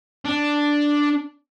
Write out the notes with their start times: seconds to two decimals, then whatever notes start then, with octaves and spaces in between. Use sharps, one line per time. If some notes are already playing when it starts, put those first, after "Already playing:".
0.25 D4